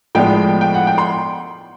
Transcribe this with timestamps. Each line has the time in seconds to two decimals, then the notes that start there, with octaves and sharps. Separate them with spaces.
0.15 A2 F3 G#3 B3 D4 G5
0.61 G5
0.74 F#5
0.87 G5
0.98 C6